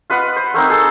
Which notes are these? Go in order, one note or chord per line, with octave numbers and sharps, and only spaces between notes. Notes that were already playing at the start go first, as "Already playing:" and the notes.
F4 B4 D#5 F#5
C5
A3 A#3 C4 D#4
G#4 A4